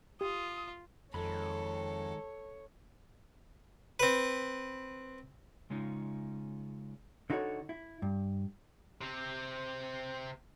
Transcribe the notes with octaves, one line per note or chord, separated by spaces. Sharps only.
F4 G4 D#6
F2 D#3 G#3 A4 C#5 B5
C4 B4
C#3 G#3 C#4 D#4 F4
D3 D#4 F#4 A4 A#4 C#5
E4
G2
C3 C4